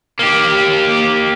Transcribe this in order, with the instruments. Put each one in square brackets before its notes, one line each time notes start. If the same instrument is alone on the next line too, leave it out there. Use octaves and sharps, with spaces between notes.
[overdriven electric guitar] A#3 G4